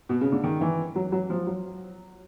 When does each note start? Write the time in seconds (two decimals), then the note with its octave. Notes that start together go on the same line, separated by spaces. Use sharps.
0.09 B2
0.21 C#3
0.32 D3
0.44 D#3
0.61 E3
0.96 F#3
1.12 F#3
1.30 F3
1.47 F#3